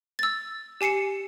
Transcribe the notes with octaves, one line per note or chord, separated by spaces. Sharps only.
E6 A6
G4 G#5 C7 C#7 E7